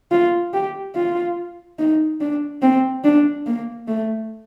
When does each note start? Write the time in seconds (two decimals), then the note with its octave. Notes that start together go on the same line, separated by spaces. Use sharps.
0.11 F4
0.53 G4
0.95 F4
1.79 D#4
2.21 D4
2.62 C4
3.04 D4
3.46 A#3
3.88 A3